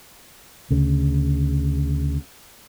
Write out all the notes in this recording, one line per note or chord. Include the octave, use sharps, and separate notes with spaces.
D2 C#3